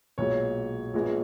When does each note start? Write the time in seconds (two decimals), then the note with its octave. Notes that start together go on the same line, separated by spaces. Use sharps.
0.18 B1 A#2 G#3 C#5
0.94 A#1 A#2 G#3 B3